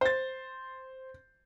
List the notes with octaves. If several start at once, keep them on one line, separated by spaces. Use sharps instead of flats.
C5 A6